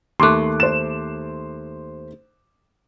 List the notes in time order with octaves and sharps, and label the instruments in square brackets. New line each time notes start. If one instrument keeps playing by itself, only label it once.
[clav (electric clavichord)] D#2 A3 [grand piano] C6 D6 F#6
[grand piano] C5 E7